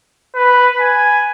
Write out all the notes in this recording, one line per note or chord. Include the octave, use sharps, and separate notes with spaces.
B4
G#5